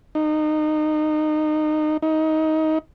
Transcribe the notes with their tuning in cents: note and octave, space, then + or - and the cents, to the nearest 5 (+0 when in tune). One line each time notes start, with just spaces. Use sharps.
D#4 -20
D#4 +20